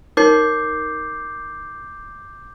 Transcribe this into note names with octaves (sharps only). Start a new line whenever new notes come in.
D#4 A#4 C#5 D6 G6 C7